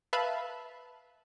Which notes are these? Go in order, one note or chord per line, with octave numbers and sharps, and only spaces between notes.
B4 E5 F5 A5 B5